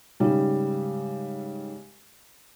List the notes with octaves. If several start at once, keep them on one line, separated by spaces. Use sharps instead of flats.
G#2 C#3 G3